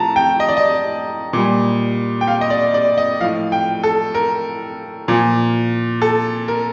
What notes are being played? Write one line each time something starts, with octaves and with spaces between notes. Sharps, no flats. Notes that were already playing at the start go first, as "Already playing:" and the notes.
Already playing: A2 F3 A5 A#5
G5
D#5
D5
D#5
A#2 G3
G5
F5
D#5
D5
D5
D#5
A2 F3 F5
G5
A4
A#4
A#2 F3
A4
A#4